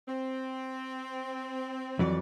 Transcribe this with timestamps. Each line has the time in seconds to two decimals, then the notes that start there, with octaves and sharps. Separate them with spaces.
0.08 C4
1.99 F2 E3 F#3 D5